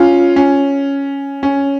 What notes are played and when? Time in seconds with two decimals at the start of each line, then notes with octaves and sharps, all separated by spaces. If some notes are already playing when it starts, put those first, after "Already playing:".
Already playing: C#4 F4
0.36 C#4
1.43 C#4